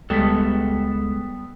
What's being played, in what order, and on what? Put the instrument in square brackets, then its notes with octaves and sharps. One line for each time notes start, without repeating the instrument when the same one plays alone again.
[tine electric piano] C#2 G#3 B6 [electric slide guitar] G3 B3 A4